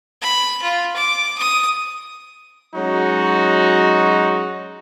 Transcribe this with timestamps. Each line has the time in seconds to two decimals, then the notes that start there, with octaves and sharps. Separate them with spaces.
0.22 B5
0.62 F4
0.96 D6
1.38 D#6
2.75 F#3 G#3 C#4 D#4 F#4